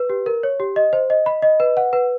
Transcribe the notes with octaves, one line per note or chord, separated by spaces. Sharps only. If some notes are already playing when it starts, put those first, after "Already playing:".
Already playing: B4
G4
A#4
C#5
G4
D#5
C5
D#5
B5
D#5
B4
F#5
B4